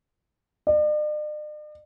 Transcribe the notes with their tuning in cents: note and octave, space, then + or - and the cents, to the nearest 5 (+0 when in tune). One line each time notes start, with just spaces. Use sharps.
D5 +45